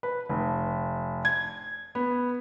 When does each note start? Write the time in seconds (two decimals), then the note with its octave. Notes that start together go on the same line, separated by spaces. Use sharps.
0.03 B4
0.29 F1
1.25 G#6
1.95 B3